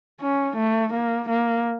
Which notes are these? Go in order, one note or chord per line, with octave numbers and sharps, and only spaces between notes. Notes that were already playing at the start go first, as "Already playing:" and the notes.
C#4
A3
A#3
A#3